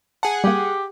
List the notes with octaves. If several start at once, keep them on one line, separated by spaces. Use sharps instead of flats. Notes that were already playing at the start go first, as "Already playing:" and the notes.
G#4 F#5 A5
G3 A#3 G4